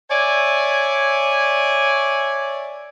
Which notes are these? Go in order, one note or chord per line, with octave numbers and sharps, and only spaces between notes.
C#5 D5 E5 G#5